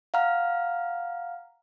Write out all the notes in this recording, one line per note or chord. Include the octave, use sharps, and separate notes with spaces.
F5 F#5 A#5 F6